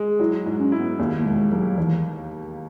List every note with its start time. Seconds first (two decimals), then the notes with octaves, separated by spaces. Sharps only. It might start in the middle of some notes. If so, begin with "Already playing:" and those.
Already playing: G#3
0.19 F#3 E4
0.46 G#2
0.59 C#4
0.72 E4
0.79 B3
0.99 D#2 A#3
1.18 A#3
1.25 E1 G#3
1.51 F#3 A#3
1.70 F#3
1.77 D#2 E3